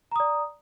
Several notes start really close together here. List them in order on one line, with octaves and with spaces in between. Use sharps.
A#5 D#6 D5